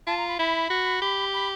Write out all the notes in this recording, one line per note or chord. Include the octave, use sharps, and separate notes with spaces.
F4 A5
A#5
B5
E4 B5
F#4
G4
B5